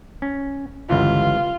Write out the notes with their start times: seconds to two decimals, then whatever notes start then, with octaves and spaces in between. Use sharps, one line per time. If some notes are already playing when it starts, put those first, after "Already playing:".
0.22 C#4
0.90 G1 C#2 E3 F4